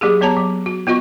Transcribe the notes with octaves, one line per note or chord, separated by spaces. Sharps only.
F#3 A#3 G4 G#4
F#3 B3 C#5 A5 A#5
F#3
F#4
B3 F4 F#4 D#5 C#6